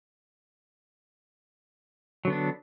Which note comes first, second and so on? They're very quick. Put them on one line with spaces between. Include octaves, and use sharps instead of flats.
F#3 D3 B3 D4